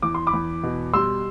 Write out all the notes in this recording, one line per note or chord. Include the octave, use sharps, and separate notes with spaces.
E2 D6
C6
B5 D6
E2
B2
G3 C6 E6